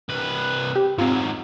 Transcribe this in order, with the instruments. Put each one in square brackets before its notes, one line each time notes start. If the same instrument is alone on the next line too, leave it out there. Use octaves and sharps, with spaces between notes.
[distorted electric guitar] C2 B4
[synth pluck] C4 G4
[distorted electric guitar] G#2 F#3 [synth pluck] C4 F4